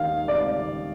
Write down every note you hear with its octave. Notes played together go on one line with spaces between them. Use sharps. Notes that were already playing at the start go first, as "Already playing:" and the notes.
Already playing: D#2 D#3 F5
D5